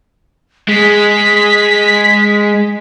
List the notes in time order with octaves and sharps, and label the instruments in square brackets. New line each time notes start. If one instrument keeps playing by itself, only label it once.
[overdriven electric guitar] G#3 [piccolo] B6